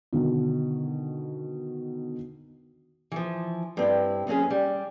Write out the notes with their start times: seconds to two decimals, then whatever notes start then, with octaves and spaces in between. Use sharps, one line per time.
0.13 B2 D3 D#3
3.12 E3 F3
3.77 G2 C4 E4
4.27 D#2 F#3 C4 C#4 G#4
4.50 G3